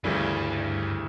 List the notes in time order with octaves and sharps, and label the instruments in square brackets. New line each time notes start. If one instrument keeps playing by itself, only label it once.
[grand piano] D2 C#3 E3 G3 [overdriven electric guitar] G2